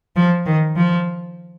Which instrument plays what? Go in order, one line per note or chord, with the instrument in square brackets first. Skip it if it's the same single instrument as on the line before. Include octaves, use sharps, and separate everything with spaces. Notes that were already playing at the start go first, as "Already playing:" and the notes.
[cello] F3
D#3
F3